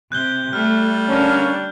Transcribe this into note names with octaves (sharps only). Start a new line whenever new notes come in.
C3 F#6 G6 G7
G3 A3 F6
D3 A#3 C#4 D4